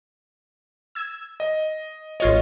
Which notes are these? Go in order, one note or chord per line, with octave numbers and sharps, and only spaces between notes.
E6 G#6
D#5
A1 F4 C#5 D#5